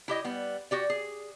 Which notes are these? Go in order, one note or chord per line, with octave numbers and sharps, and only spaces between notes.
E4 G4 D#5
G3 B3
F#4 G4 D5
G#4